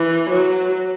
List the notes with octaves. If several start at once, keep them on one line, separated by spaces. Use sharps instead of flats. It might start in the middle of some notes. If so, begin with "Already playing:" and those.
Already playing: E3
F#3